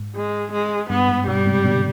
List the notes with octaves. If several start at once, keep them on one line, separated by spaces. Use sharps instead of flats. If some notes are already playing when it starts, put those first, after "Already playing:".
Already playing: G#2
G#3
G#3
G2 B3
G#2
G2 B2 G3
G#2 C3
B2 D3